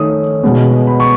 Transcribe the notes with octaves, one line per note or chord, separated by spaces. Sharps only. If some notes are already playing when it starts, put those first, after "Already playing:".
Already playing: D#3 A3 C#4 D#6
B2 G#3 B3
B5
C#6